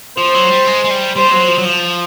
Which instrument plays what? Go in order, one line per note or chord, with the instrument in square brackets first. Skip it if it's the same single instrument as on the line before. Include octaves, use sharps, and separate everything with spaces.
[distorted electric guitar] F3 [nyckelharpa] C5
[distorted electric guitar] F#3
G3
G#3
G#3
G3
[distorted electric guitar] G3 [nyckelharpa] C5
[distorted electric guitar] F#3
F3
F#3
F3